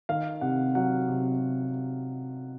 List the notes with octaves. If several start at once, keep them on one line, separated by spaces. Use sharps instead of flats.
D#3 F5
C3 F#5
F#3 F#5
C3